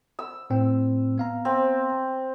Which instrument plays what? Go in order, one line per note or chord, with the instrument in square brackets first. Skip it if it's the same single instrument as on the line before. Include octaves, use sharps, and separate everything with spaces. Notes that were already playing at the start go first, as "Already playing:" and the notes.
[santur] E6
[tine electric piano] A2 C4
B3 F5 A#5
[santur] C4